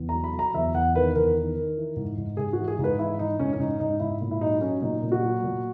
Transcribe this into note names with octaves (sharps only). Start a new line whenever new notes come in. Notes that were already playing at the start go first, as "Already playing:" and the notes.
Already playing: E2
F#3 A#5
B5
F#3
A#5
E2 E5
E2 F#5
D#3 B4
E2 A#4
D#3
D#3
E3
G#2
G#2
G#2 G#4
F#4
E3
G#4
G#2
B4
E3 E4
E3 D#4
G#2 C#4
C#4
G#2 D#4
G#2 D#4
G#2 E4
A#2
E4
F#3 D#4
F#3 C#4
A#2 D#4
A#2
F#4
F#3
A#2